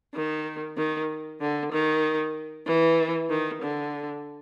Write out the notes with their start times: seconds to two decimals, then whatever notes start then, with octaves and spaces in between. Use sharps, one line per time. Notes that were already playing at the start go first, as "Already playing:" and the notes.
0.15 D#3
0.77 D#3
1.41 D3
1.72 D#3
2.67 E3
3.29 D#3
3.62 D3